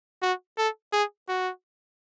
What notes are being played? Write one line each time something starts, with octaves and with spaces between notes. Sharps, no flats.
F#4
A4
G#4
F#4